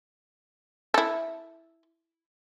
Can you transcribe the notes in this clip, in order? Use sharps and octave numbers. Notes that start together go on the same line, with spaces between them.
E4 A4